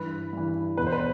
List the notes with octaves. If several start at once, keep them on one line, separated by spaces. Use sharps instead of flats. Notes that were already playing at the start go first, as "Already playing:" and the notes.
Already playing: G2 E3 B4
G2 E3
E2 B2 B4
C5
B4